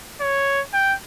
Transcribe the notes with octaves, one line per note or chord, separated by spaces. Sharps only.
C#5
G5